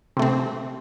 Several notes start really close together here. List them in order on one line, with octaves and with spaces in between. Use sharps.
C3 A3 C4